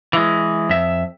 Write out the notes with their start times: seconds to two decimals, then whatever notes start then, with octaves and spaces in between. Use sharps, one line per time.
0.13 E3 G#3
0.69 F2 E5